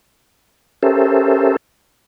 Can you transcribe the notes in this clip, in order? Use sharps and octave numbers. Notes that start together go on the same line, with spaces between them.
C#4 G4 A4 A#4 C5 E5